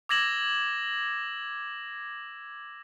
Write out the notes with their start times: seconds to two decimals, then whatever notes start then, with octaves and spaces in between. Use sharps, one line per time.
0.09 D6 E6 G#6 A#6 E7 F#7